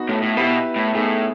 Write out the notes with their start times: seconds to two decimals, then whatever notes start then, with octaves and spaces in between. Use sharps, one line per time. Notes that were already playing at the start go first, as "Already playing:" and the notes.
Already playing: B3 D#4 F#4
0.09 A2
0.22 A2
0.37 B2 B3 E4 G4 B4
0.76 A2
0.94 A2 B3 D#4 G#4